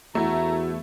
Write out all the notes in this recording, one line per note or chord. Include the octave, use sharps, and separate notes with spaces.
E2 A3 E4 F#4 A#5